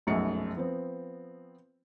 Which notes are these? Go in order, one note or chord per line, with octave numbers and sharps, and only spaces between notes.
F1 B1 F#2 G#3 A3 C#7
F3 B3 C4